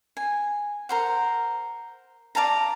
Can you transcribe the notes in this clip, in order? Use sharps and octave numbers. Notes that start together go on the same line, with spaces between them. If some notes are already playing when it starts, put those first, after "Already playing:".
G#5
A#4 C5 F#5
D5 F5 A5 A#5